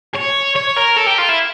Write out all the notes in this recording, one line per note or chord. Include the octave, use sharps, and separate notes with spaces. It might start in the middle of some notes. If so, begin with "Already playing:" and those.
C#5
C#5
A#4
A4
G4
F4
E4